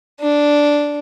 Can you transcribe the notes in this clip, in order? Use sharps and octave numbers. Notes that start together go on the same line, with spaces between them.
D4